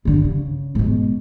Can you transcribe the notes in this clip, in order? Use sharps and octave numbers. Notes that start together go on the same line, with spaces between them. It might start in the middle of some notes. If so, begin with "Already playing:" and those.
G2 D3
C#3
G#2 B2